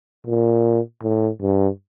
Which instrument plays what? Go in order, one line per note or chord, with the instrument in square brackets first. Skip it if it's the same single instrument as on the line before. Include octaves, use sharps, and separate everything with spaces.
[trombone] A#2
A2
G2